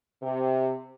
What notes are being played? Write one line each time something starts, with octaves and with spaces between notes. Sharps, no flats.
C3